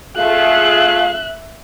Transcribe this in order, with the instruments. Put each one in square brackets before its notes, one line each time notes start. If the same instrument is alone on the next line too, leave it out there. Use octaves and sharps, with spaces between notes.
[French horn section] A3 F4 G#4 [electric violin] E5 F#6 [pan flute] F5